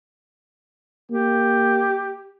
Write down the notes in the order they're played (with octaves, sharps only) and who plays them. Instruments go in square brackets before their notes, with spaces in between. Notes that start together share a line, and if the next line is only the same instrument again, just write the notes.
[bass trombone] A#3 [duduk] G4